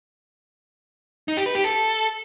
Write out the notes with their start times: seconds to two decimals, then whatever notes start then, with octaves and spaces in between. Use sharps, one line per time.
1.28 D#4
1.37 G4
1.46 B4
1.55 G4
1.64 A4